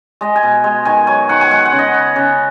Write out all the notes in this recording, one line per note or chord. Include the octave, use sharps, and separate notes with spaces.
G#3 D#5
G#5
B2
G#3
D#3 G#5
F#3 G#5
D#3 F#5
G#5
G#3 F#5
F#5
C#3
D#5
B3
C#3